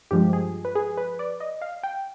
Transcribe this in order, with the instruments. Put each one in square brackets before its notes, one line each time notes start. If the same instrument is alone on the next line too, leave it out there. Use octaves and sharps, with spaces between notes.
[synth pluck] G2 F3 G#3 G4
G#4
B4
G#4
B4
D5
D#5
F5
G5